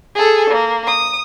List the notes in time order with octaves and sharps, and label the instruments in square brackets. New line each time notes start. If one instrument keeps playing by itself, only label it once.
[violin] G#4 A4
A#3
D#6